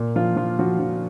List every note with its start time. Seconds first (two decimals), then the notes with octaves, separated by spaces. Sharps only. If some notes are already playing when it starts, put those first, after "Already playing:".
Already playing: A#2
0.16 F3 F4
0.36 F3 F4
0.59 F3 F#4
0.79 F3